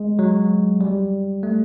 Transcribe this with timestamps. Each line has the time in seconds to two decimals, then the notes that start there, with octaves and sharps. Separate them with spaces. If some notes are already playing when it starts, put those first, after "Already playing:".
Already playing: G#3
0.19 F#3
0.81 G3
1.43 A3